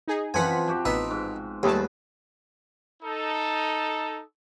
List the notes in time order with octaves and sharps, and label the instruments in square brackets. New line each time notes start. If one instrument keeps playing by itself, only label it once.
[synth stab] D#4 G#4
[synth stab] F#2 F#5 B6 [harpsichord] E3 G#5 [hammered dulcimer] F3 C4
[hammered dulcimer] F#4 G4
[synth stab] A1 B3 [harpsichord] D#4 B4 E5
[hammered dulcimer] G#2
[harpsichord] D#2 [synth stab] G3 A3 A5 [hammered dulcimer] G#4 B4 F#5
[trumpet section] D#4 A4